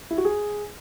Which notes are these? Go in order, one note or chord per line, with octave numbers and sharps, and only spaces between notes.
E4
F#4
G#4